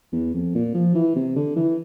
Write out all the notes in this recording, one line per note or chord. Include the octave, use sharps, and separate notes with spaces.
E2
F2
A#2
F3
E3
C3
D3
E3